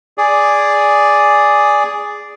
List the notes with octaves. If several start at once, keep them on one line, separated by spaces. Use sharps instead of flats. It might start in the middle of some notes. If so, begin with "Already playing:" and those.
G#4 D5